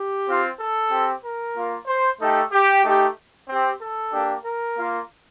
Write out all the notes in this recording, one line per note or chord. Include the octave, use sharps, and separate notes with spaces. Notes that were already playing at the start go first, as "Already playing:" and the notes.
Already playing: G4
C4 F4
A4
C4 G4
A#4
A#3 F4
C5
A3 D#4 G4 A4
G4
A3 D#4 G4
C4 G4
A4
A#3 D4 G4
A#4
A#3 F4